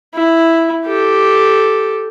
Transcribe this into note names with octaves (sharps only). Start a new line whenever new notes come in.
E4
G4 A4